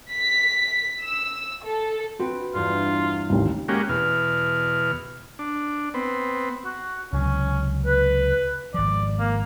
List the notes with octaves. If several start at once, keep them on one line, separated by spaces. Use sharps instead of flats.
B6
E6
A4
C4 F#4 B4
E2 G2 F4
A1 D#2
G#3 A#3 C#4 F#4 G4
E2 B2 F6
D4
B3 C4
F#4
C#2 C3 F#3 C#4
B4
G#1 F3 D5
A#3